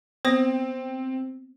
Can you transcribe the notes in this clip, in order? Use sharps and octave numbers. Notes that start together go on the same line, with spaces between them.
B3 C4 C5 D#6 A#6